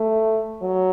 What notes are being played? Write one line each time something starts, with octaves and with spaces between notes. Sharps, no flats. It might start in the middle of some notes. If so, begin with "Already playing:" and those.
Already playing: A3
F#3